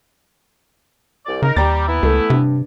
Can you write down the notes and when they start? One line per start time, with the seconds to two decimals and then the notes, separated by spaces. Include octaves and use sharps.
1.26 C2 D5
1.42 C#3 D#4 A#4
1.56 D#2 G3 A#5 A6
1.87 E3 B3 E4
2.03 C#2 A3
2.30 G2 C3